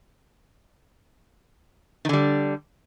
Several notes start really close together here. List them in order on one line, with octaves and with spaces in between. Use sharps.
D#3 D3 G3